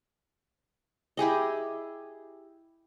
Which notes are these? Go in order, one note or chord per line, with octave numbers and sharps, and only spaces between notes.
E4 G4 G#4 D#5